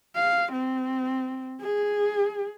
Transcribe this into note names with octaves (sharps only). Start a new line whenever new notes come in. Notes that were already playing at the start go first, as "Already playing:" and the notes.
F5
C4
G#4